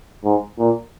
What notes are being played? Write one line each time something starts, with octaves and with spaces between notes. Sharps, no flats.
G#2
A#2